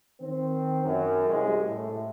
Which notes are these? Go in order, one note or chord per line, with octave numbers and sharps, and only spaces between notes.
D#3 C4
F#2
C2 G#3
A2